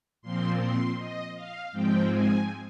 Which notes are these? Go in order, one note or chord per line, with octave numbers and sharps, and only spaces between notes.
A#2 F3 C4 C6
C6
D#5
F5
G#2 F3 G#3 C4 G5
G#5